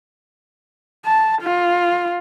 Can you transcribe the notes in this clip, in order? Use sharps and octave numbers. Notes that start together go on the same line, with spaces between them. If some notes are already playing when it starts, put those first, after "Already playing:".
A5
F4